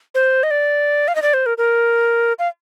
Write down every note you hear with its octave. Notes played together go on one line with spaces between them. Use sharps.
C5
D#5
D5
F5
D#5
D5
C5
A#4
A#4
F5